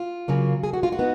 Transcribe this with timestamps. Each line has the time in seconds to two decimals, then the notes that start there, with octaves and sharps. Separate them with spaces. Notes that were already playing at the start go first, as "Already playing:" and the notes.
Already playing: F4
0.28 C#3 F#3 A#3
0.63 G#4
0.73 F#4
0.83 F4
0.92 F#4
0.99 B3 D#4